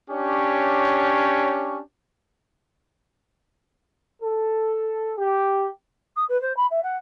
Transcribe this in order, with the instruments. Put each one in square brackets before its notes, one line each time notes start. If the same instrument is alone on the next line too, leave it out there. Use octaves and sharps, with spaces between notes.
[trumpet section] C#4 D4 G4 C#5
[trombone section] A4
G4
[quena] D#6
B4
C5
B5
E5
F#5